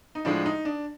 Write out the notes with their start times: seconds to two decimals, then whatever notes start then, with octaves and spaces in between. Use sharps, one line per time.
0.15 D#4
0.25 A2 F3 G#3 D4
0.46 D#4
0.65 D4